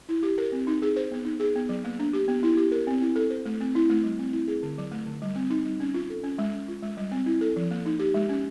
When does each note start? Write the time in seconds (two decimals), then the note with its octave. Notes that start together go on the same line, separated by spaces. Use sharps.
0.09 E4
0.23 G4
0.38 A#4
0.52 C4
0.67 D#4
0.82 G#4
0.96 C5
1.11 B3
1.25 D#4
1.40 G#4
1.55 B3
1.69 F#3
1.84 A#3
1.99 D4
2.13 G4
2.28 B3
2.43 E4
2.57 G4
2.72 A#4
2.87 C4
3.01 E4
3.16 A4
3.30 C5
3.46 A3
3.61 C4
3.75 E4
3.90 A3
4.04 G3
4.19 C4
4.33 E4
4.48 G#4
4.63 D3
4.78 F#3
4.92 A3
5.06 D3
5.22 G3
5.36 C4
5.50 D#4
5.66 G3
5.80 C#4
5.94 F4
6.10 A4
6.24 C#4
6.39 G#3
6.53 C#4
6.68 F4
6.83 G#3
6.97 G3
7.12 C4
7.26 E4
7.41 A4
7.56 F3
7.71 A#3
7.86 D#4
7.99 G4
8.14 G#3
8.29 C#4